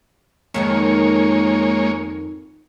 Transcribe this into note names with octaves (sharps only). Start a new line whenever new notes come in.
F2 D#3 G#3 A#3 D#4 C#5